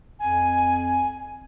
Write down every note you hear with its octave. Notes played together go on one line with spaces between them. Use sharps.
F2 G#5